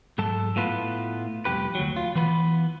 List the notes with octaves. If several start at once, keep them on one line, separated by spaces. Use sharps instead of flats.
G#2 F#3 A4 A5
A2 B3 F4 B4
C2 F2 G4 B4
D2 F#3
F4
E3 B3 B4 B5